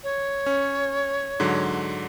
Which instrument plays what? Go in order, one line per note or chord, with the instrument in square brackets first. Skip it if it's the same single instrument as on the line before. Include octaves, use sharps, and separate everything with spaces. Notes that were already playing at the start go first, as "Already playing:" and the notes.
[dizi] C#5
[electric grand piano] C#4
G#2 D3 F#3